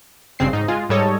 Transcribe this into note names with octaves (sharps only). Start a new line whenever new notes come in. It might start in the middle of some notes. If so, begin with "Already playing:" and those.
G#1 G2 C#3 C4 C7
G#2 D#4
G#3 F4 G#4
G#2 G3 A4 C#5 D#5